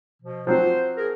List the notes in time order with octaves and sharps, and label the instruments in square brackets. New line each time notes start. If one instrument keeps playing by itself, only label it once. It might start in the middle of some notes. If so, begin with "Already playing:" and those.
[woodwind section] B2 F3
[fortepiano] F3 F#3 C4 [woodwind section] C5
[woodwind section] G#4 A#4